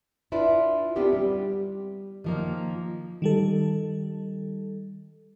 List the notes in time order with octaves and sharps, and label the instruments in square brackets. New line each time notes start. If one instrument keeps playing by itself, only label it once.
[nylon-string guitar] D4 E4 F4 B4 D5
B3 C4 D4 E4 G4 A#4
G3
D#3 F3 A#3
[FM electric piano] D#3 G3 A4